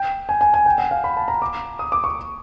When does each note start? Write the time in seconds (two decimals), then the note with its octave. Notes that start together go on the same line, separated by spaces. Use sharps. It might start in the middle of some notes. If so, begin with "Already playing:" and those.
Already playing: G5
0.29 G#5
0.41 G#5
0.54 G#5
0.66 G5
0.78 F#5
0.91 F5
1.04 B5
1.17 A5
1.28 A#5
1.42 D6
1.79 D#6
1.92 D6
2.04 C#6